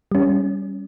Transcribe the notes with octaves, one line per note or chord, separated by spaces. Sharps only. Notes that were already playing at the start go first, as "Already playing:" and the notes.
G3 C#4